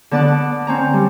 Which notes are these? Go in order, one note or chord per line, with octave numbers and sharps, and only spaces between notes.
D3 B3 D5 A5 F#6
C4 C#4 A#5
G3